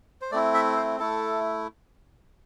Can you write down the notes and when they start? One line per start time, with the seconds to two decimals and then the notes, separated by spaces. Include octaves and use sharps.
0.21 C5
0.32 A3 C4 E4 D5
0.54 E5
0.76 C5
0.99 A3 E4 A4